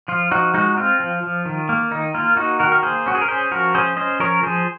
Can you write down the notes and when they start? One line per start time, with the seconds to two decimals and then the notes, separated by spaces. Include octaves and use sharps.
0.08 F3 F4
0.31 F3 D#4 F#4
0.54 G#3 D#4 F#4
0.77 C4 F4
1.00 F3
1.23 F3
1.46 D#3
1.69 A#3
1.91 D#3 D#4
2.14 A#3 F4
2.37 A#3 D#4 F#4
2.60 D#3 F#4 A#4
2.72 A#4
2.83 A#3 G#4 C5
3.06 C#4 F#4
3.15 G#4
3.22 A#4
3.29 C#4 G#4 C5
3.51 F3 F#4 A#4
3.75 C#4 G#4 C5
3.97 C#4 C5 D#5
4.20 F3 A#4 C#5
4.43 F3 G#4 C5